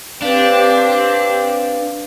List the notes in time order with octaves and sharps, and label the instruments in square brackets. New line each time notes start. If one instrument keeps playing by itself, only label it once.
[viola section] C4 G4 [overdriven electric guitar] D4 [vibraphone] B4 F5